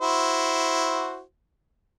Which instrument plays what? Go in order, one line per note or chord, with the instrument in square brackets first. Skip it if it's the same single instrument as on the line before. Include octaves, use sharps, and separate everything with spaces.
[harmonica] E4 F#4 C5